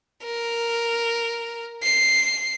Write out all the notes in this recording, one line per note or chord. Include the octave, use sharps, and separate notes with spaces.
A#4
C7